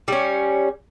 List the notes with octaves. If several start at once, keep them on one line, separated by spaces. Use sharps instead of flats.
G3 C#4